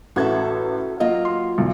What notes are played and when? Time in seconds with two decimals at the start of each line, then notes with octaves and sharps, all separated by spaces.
0.16 A1 F#4 A4 E5 G#6
1.00 F#3 A#3 F4 D#5
1.25 C6
1.58 B1